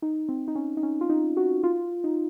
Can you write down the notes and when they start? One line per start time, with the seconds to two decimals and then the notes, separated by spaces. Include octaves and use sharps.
0.02 D#4
0.29 C4
0.48 D#4
0.55 C#4
0.77 D#4
0.83 C#4
1.01 F4
1.10 D#4
1.37 F#4
1.63 F4
2.04 D#4